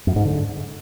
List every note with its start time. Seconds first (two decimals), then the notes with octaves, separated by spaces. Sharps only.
0.07 F#2
0.16 G#2
0.25 D3